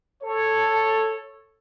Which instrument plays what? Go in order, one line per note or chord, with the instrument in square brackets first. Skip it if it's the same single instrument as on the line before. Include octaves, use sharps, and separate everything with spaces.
[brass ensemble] A4 C#5